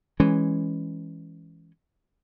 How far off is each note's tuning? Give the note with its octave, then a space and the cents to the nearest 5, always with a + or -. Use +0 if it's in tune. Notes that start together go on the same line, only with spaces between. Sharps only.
E3 +0 G#3 +0 C#4 +0